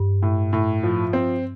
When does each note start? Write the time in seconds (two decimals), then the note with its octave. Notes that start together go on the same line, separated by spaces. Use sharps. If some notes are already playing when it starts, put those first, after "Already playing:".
Already playing: G2
0.22 A2
0.53 A2
0.83 F3
1.13 C4